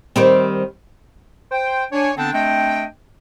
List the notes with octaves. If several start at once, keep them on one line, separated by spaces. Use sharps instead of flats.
D#3 G3 C4
C5 G5
D4 C#5 G#5
D3 B3 C4 D4 G5 A5
A3 C4 D4 D#5 G5